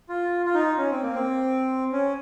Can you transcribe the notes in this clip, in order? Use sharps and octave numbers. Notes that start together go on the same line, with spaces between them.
F4
F4
D#4
C#4
C4
A#3
C4
C#4